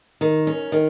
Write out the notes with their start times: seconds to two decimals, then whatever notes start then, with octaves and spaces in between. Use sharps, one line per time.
0.21 D#3
0.47 C#4
0.72 D#3